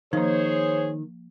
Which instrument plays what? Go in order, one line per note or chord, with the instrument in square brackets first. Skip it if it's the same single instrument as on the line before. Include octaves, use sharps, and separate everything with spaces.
[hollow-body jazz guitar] D#3 [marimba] F3 A#3 [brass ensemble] G#4 C5 C#5